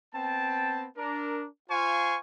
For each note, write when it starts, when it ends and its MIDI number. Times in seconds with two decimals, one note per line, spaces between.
0.14 0.86 59
0.14 0.86 60
0.14 0.86 79
0.14 0.86 81
0.97 1.46 62
0.97 1.46 70
1.70 2.18 65
1.70 2.18 72
1.70 2.18 77
1.70 2.18 80
1.70 2.18 84
1.70 2.18 85